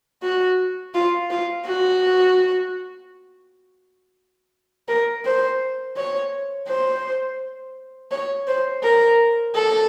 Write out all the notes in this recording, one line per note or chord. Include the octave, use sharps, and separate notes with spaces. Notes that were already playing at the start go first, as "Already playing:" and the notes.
F#4
F4
F4
F#4
A#4
C5
C#5
C5
C#5
C5
A#4
A4